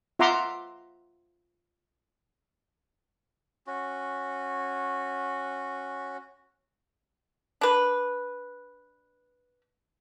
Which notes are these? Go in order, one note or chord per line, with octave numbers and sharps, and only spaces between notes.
F4 E5 F#5 A#5 C6 D6
C#4 F#4
D4 B4